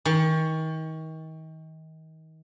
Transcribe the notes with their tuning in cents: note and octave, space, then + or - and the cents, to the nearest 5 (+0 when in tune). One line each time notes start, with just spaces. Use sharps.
D#3 +35